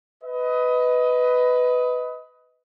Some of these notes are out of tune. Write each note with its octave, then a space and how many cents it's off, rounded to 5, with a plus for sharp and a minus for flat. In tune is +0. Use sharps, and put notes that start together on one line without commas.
B4 +10 D#5 +20